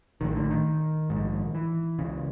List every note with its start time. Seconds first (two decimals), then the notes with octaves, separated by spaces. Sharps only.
0.21 A#1 A2 D#3
0.36 D3
0.50 D#3
1.10 A#1 G#2
1.55 E3
1.99 C#2 C#3